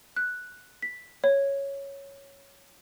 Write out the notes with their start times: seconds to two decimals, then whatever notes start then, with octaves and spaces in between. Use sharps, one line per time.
0.16 F#6
0.82 B6
1.24 C#5